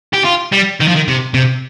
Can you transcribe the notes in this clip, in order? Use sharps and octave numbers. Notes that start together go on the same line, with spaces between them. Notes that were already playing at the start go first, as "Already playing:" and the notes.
G4
F4
G3
D#3
F3
D#3
C3
C3